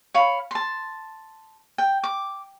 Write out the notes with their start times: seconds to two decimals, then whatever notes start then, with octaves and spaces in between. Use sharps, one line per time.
0.14 C#5 F5 B5
0.51 A5 C6
1.78 G5
2.04 D6